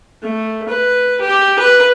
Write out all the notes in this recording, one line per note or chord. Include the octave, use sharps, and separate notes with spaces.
A3
B4
G4
B4